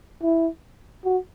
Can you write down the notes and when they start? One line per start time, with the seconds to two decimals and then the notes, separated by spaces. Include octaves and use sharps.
0.23 E4
1.05 F#4